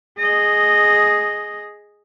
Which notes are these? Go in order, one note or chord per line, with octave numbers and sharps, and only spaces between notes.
G#4 D#5